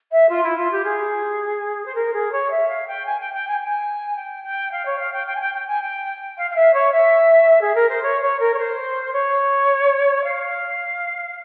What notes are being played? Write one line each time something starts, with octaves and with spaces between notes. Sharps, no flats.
E5
F4
E4
F4
G4
G#4
C5
A#4
G#4
C#5
E5
F5
G5
G#5
G5
G5
G#5
G#5
G5
G5
F5
C#5
F5
G5
G5
G#5
G5
G5
G#5
G5
F5
F5
E5
C#5
E5
G#4
A#4
C5
C#5
C#5
A#4
C#5
C5
C#5
F5